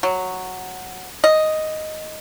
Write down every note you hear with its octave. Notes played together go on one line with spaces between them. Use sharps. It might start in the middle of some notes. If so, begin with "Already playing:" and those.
F#3
D#5